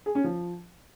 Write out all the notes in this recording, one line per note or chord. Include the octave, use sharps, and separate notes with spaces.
G#4
C#4
F3